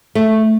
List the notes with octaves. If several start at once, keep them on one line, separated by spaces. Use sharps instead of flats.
A3